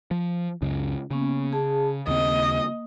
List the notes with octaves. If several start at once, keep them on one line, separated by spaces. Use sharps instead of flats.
F3
C#2 F#2 C#3
C#3 A#3 B3 C#4
G#4 A5
D#2 C#3 A#3 C4 D#5